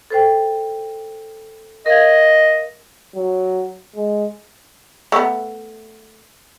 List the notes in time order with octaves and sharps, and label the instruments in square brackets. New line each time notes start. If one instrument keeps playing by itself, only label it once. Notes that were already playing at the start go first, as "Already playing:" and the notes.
[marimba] A4 C5 G5
[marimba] A#4 F5 G#6 [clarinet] D#5
[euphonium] F#3
G#3
[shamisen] A3 B3